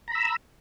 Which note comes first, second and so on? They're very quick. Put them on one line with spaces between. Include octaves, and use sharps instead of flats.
A#5 B5 E6